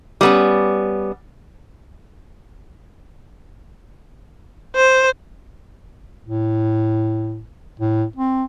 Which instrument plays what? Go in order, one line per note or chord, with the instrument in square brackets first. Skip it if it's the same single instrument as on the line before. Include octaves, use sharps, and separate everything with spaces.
[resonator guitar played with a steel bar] G3 B3 C#4
[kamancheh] C5
[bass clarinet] A2
A2
C4